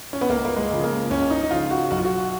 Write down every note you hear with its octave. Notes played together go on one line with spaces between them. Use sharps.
C#4
B3
C#2 A#3
A#3
G#3
C#3 F3
A#3
C#2 C#4
D#4
D#4
C#3 F3 F4
F#4
B1 F#4
F4
F#4